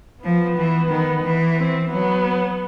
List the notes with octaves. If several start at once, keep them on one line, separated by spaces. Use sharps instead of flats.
F3 B3
E3
D#3
E3
C4
F#3 B3